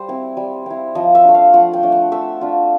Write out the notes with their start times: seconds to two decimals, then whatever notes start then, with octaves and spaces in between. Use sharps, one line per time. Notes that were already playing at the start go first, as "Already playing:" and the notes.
Already playing: G3 C5
0.08 C4 E4
0.37 G3
0.66 C4 E4
0.95 F3 D#5
1.15 E5
1.24 A3 D4
1.34 F5
1.53 F3 F#5
1.73 G5
1.83 A3 D4
1.92 F#5
2.12 A3 E5
2.41 D4 F4